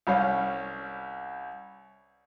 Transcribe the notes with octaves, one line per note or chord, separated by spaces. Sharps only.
C2 G3 C#4 F5